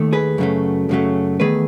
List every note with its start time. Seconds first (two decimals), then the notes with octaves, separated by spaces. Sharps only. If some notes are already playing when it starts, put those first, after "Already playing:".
Already playing: D#2 D#3 A3
0.13 G#4 B4
0.38 F#2 C#3 F#3 A3
0.89 F#2 C#3 F#3 A3
1.40 E2 D#3 A3 G#4 B4